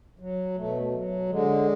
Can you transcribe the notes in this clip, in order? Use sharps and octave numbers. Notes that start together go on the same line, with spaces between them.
F#3
B2 A3
F#3
D3 G#3